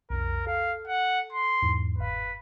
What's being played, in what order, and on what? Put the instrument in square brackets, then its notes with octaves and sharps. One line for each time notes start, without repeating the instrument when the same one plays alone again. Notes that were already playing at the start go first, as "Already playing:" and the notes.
[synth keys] B1 F2 [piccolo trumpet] A#4
[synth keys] A4 [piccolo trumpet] F5
[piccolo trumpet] F#5
C6
[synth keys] E2 G#2
[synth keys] G1 F5 [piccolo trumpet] B4